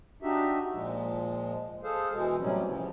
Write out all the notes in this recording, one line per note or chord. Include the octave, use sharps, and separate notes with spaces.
D4 D#4 F#4 G4 E5
A#2 F3 G#3
G#4 A4 C5 F5
B2 E3 G#3
A2 C3 F#3 G3 C#4
C#3 E3 F3